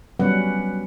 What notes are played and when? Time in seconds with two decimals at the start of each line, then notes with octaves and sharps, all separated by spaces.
0.20 F#3 G3 B3 C#4 B4 F#5